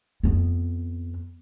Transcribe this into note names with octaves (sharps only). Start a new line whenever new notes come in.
F2 B3